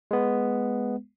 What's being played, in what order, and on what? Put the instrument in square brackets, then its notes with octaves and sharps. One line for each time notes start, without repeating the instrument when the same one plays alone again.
[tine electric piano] G#3 B3